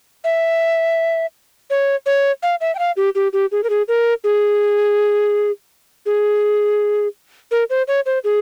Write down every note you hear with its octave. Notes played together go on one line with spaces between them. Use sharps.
E5
C#5
C#5
F5
E5
G5
F5
G4
G4
G4
G#4
A#4
G#4
A#4
G#4
G#4
A#4
C5
C#5
C5
G#4